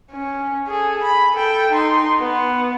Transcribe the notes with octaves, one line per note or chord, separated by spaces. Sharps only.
C#4
G#4 A4
B5
A4 G5
D#4 C6
B3